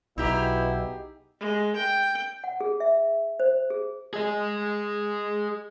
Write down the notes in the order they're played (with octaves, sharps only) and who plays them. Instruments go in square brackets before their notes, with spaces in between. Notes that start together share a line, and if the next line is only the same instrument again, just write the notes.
[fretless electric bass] B1 [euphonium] B2 [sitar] D#4 G4 G#4 [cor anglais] E4
[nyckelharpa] G#3
G5
[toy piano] F#5
G#4
E5
C5
G#4
[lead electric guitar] G#4 D#5